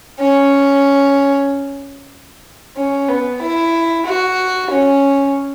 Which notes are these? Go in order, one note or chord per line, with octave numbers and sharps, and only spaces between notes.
C#4
C#4
B3
E4
F#4
C#4